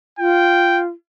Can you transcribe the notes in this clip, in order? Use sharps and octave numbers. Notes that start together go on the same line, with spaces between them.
F4 G5